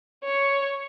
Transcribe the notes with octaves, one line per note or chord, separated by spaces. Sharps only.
C#5